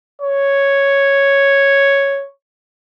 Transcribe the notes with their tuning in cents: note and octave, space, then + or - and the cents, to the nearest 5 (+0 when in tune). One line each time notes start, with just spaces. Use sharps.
C#5 +0